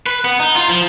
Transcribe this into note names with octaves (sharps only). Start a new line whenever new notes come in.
B4
B3
D#4
F4
F3